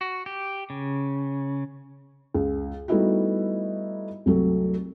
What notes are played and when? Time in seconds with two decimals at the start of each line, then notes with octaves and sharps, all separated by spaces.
0.01 F#4
0.26 G4
0.70 C#3
2.35 C#2
2.88 G3 A3 B3 D#4 E4 F#4
4.26 C2 C3 F#3 A3